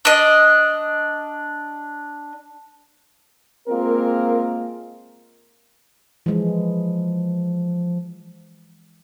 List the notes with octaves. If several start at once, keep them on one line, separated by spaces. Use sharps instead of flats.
D4 D#5
G#3 A#3 C4 F4 A#4
E3 F3 G#3